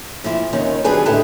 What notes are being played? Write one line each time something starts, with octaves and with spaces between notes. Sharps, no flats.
A#2 F3 E4
D#2 D#3 C#4 D#4
F#3 G3 B3 D4 G#4 B4
A2 D3 G#3 E4 G4 A4